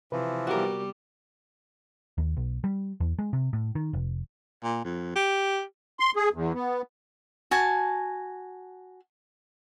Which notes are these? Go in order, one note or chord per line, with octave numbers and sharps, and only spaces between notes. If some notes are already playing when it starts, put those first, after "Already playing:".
C3 E3 F3 B4
G3 B3 F#4 G4 A#4
D#2
B1
G3
E2
G#3
C3
A2
D#3
F1
A#2
F2
G4
C6
G#4
E2
B3
F#4 G#5 A5